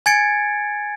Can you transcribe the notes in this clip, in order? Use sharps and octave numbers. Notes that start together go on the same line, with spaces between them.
G#5 G#6 A6 C#7 D7